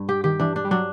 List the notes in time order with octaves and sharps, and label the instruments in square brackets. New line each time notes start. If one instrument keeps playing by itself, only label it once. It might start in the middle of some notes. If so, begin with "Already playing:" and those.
Already playing: [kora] G2
G4
[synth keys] D#3 [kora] G4
[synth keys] E3 [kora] D4
[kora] D4
[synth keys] G3
[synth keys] F#3 [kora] D4